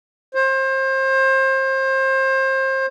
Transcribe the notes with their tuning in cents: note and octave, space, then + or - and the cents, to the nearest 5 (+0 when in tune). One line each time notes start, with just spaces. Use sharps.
C5 +30